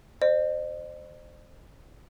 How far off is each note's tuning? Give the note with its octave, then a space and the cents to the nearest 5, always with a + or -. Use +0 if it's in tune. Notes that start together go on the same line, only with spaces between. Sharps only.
C5 +0 D#5 -45